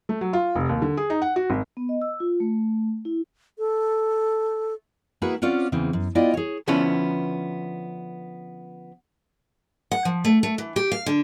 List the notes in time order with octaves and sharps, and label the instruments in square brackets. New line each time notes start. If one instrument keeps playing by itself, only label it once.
[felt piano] A3
F#3
F4
F1
D#2
D3
G#4
D#4
F#5
F#4
G#1
[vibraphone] B3
D#5
E6
F4
A3
E4
[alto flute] A4
[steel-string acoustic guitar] A#3 E4 F#4 G#4 B4 F#5
C4 C#4 F4 D5 F#5
E2 C#3 E3 C4
F#2
B3 E4 F4 D5 D#5 G5
G#4 C#5
[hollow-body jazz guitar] D3 F3 B3 C#4 E4 B4
[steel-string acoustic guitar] F#5
F3
A3
A3
E3
G4
F5
D3